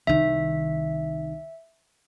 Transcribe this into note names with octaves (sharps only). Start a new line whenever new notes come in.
C2 D#3 E5